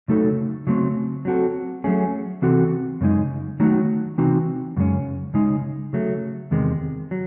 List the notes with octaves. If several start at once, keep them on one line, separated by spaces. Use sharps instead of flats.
C#3 F#3 A3 D#4 A4
C#3 F#3 A3 C4
F#3 C4 F#4 A4
F#3 A3 C#4 G#4
C3 E3 C4 F#4 A4
F#2 C#3 G#3 D#4
D#3 F#3 A3 D#4 F#4
C3 E3 C4 D#4 F#4
F#2 C#3 G#3 C#4
C#3 G#3 D#4
C#3 F#3 A3
E2 C3 D#3 G#3
F#3